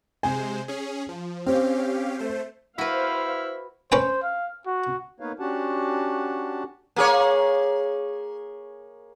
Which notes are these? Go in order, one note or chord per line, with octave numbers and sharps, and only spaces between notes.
C3 G#3 C5 G#5
C#4 G#4
F3
C4 C#4 G4 F5
A3 C5
E4 F#4 B4 C5 F5
C#4 B4 C5 G5
F5
F#4
A#3 B3 D#4 B4 C#5 F5
C#4 D4 F#4 G4 F#5 A5
A#3 G#4 C#5